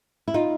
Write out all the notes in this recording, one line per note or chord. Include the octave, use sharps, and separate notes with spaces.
E4
D#4 F4